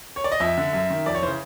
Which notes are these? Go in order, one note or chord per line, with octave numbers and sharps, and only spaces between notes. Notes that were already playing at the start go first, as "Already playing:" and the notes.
C#5
D5
D#5
F2 E5
D3
F#2 E5
D#3
F2 D5
C#5
C#3 E3 C5